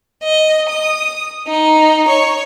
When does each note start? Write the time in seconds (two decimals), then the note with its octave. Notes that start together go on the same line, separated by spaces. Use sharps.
0.23 D#5
0.68 D#6
1.46 D#4
2.07 C#5